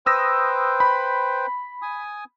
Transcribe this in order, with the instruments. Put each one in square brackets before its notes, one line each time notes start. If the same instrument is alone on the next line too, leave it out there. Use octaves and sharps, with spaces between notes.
[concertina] B4 C5 G5 [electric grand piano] D#6 E6 A#6
[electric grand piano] B5
[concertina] G#5 D#6